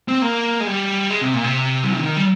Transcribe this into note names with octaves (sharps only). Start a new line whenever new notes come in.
C4
A#3
G#3
G3
G#3
C3
A#2
C3
G3
F3
D#3
G3